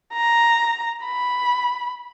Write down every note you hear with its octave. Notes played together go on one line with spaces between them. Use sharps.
A#5
B5